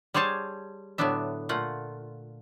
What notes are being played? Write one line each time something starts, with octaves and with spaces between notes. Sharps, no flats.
G3 G#4 C5 C#5 A5
A2 D3 F#3 B3 D4 E5
A#2 A3 F4 F#5